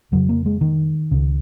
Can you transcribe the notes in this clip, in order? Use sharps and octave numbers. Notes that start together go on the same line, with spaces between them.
F2 C#3 F#3
A#3
G#3
D#3
C#2 C#3